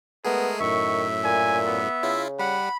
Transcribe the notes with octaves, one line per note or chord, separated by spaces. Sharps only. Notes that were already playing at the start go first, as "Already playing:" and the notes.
G#3 A3 B3 G#4 A#4
F#2 A2 D#3 E5 C#6
A#2 G#5
B3
C#3 E4 F4
G3 F#5 B5